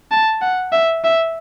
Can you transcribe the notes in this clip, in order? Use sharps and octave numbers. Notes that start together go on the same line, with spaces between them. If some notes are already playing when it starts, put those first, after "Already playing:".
A5
F#5
E5
E5